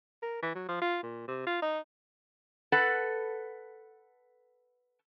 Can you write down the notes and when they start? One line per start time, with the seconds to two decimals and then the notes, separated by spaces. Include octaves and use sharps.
0.22 A#4
0.42 E3
0.55 F#3
0.68 F3
0.81 F4
1.03 A#2
1.28 C3
1.47 F4
1.62 D#4
2.72 A4 B4 F#5